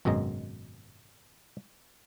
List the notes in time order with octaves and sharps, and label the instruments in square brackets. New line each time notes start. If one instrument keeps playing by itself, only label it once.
[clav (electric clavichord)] G#1 F#2 B2 G#3 D#5 A#5